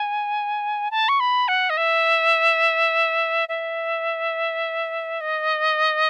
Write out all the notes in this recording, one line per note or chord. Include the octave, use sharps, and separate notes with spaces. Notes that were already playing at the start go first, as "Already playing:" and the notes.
Already playing: G#5
A5
C#6
B5
F#5
D#5
E5
E5
D#5